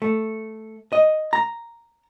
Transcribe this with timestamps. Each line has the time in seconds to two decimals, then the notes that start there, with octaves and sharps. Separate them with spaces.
0.02 A3
0.93 D#5
1.33 A#5